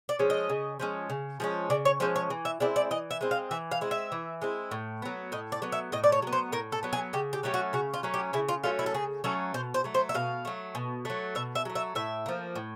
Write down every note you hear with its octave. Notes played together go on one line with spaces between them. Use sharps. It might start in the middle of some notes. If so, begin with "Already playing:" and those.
D5
F3 G#3 C#4
D#5
C#3
F3 G#3 C#4
C#3
F3 G#3 C#4
C#3 D5
C#5
F3 G#3 C#4 C5
C#5
E3
E5
G#3 C4 E4 D5
D5
E3 D#5
E5
G#3 C4 E4
F5
E3 E5
F5
G#3 C4 E4
E5
E3
G#3 C4 E4
A2
F#3 B3
A2 D#5
D5
F#3 B3
E5
A2 D#5
D5
C#5
F#3 B3
C5
A2 A#4
A4
F#3 B3
G#4
C#3 G4
G4
F#3 A3 C#4 G4
F#4
C#3 F#4
F4
F#3 A3 C#4
G4
C#3 E4
F4
F#3 A3 C#4 F4
E4
A4
C#3 G#4
F#3 A3 C#4 A4
B2 C5
C5
F#3 A3
C5
E5
B2 F5
F#3 A3
B2
F#3 A3
B2 E5
E5
F#3 A3
E5
A2 E5
F3 A#3
A2